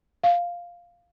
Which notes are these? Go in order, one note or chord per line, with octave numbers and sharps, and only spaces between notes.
F5